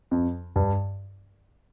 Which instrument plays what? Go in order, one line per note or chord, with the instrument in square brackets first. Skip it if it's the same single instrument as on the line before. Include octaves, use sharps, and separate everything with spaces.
[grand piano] F2
G2